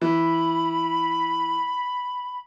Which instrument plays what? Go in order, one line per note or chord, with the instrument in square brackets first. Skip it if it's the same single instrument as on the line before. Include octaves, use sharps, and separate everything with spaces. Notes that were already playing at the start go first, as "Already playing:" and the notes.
[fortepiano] E3 [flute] B5